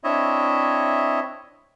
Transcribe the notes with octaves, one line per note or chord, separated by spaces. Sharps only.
C4 D4 E4 C#5 D#5 E5